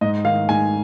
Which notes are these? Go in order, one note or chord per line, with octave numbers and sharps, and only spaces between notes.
G#2 D#5
D#3 F5
G#2 G#5